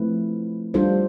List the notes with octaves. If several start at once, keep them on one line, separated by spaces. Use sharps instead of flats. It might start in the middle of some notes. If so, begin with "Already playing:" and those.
Already playing: F3 A3 C4 E4 B4
G3 D4 F4 A4 C5